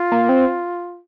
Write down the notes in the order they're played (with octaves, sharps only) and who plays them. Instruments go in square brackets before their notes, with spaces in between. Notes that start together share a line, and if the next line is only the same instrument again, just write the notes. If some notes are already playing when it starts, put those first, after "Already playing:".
Already playing: [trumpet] F4
[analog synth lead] A#3
C4